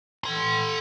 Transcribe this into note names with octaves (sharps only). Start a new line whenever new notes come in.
A4 C6